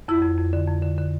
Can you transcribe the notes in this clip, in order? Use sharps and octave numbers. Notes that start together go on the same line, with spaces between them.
F2 E4
F2
F2
D3
F2
D3
D3